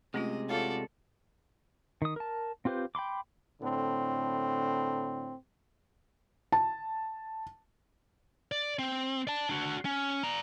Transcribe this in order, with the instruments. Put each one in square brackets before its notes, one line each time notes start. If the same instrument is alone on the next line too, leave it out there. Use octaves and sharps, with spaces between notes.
[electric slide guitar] C3 G#3 [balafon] A3 C#4 F4 [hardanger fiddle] D#5
[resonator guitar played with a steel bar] E2 F4 F#4 [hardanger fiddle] A4 D5 [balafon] C#5
[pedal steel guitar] D#3 D#6
A#4 A5
C4 F4 G4 B4 C5
G5 B5 C6 D6
[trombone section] A2 D3 C4
[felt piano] A5
[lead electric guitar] D5
C4
D5 A5
D4 F#4
C#4
D5 A#5